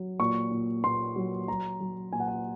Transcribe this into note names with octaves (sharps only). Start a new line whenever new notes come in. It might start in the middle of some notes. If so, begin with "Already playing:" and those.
Already playing: F#3
A#2 C#6
A#2
A#2 C6
F#3
F#3 A#5
F#3
A#2 G#5
F#5
G#5